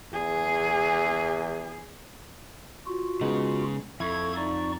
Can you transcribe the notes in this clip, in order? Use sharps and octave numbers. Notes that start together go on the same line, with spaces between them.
E2 G#4
F4 F#4
C#3 G#3 B3 D#4
F2 E4 A4 C#6 G#6
D#4 D5 C#6